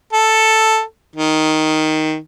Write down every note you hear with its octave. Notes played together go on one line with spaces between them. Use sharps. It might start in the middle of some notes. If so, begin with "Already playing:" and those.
A4
D#3